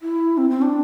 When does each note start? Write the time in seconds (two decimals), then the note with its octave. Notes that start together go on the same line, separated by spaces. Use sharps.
0.02 E4
0.38 C4
0.50 C4
0.62 D4